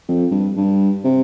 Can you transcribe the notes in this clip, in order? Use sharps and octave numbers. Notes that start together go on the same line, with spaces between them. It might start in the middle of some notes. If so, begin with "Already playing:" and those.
F2
G2
G2
C3